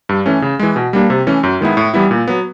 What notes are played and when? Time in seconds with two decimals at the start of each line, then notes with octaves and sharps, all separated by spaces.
0.09 G2
0.26 E3 A3 C#4
0.42 C#3
0.59 E3 G#3
0.76 B2
0.93 G3 A#3 D4
1.10 C3
1.27 E3 A3 C#4
1.43 F#2
1.61 D#3 G#3 B3 E4
1.77 A2
1.94 E3 G3 B3 E4
2.11 A#2
2.28 F#3 B3